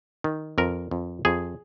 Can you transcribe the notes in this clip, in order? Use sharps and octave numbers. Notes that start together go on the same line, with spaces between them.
D#3
F2 A#4
F2
F2 G#4